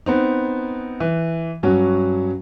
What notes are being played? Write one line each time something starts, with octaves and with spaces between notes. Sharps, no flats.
B3 C4 D#4
E3
G2 F#3 C#4 F#4